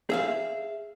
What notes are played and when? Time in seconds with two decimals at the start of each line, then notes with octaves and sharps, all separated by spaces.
0.10 G#4 E5 F5